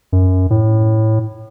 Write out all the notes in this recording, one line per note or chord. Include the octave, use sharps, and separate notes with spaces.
F#2
A2